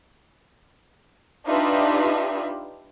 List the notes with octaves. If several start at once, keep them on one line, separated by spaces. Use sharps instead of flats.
D4 D#4 F4 G4 B4 E5